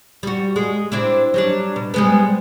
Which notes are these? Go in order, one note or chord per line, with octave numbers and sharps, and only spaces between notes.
G3 F#4
G#3
C4 D4 E4
F#3 G3 D4
B2
G3 G#3 B3